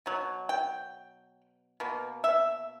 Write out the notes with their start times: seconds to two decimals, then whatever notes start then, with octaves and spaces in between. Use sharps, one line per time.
0.06 B2 F#3
0.49 G5
1.80 B2 A#3
2.24 E5